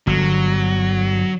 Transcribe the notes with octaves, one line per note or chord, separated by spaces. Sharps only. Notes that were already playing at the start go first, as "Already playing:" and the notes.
G1 F#3